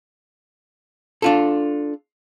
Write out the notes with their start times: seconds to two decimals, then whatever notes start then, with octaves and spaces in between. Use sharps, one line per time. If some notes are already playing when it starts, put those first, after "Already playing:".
1.22 D4 F4 A4